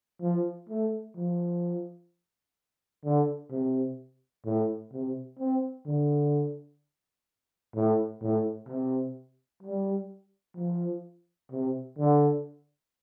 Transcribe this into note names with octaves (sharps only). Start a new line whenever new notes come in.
F3
A3
F3
D3
C3
A2
C3
C4
D3
A2
A2
C3
G3
F3
C3
D3